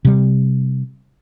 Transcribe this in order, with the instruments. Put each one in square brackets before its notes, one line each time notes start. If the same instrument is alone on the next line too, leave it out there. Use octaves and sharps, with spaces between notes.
[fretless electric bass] C3 G3